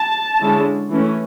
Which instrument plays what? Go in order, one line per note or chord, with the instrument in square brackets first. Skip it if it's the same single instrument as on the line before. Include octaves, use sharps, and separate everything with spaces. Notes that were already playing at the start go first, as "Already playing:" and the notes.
Already playing: [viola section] A5
D3 G#3 C#4 E4
E3 A3 C#4